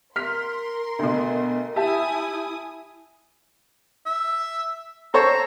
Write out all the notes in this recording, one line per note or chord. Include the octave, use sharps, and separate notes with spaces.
A#4 C6 F6 B6
D2 B2
E4 G4 E5 G#5 A5 D#6
E5
A4 C5 C#5 A#5